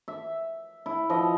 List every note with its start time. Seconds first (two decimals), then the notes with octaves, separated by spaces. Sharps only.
0.08 E5
0.86 E4
1.10 F3 D#5